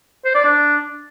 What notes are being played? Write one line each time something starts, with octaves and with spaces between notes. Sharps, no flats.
C5
D5
D4